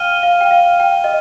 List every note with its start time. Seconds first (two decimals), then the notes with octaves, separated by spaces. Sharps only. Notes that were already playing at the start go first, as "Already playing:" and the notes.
Already playing: F5 G5 F6 D#7 G7
0.23 F5
0.41 G5
0.51 F5
0.80 G5
1.04 D#5